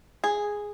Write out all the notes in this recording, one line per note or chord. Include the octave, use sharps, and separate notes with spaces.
G#4